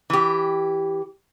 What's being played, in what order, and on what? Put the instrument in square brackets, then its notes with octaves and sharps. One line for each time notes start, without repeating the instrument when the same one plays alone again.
[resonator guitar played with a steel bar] E3 G4